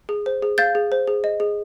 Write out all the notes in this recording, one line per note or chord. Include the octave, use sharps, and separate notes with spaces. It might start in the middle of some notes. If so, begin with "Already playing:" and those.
G#4
C5
G#4
F5 G6 A6
G#4
C5
G#4
D#5
G#4